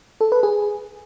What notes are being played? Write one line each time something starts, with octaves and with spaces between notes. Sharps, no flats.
A4
B4
G#4